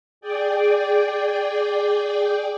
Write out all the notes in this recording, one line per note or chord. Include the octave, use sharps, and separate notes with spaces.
G#4 D5 G5